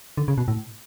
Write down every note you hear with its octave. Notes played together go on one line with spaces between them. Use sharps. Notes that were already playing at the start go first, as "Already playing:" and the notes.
D3
C#3
B2
A2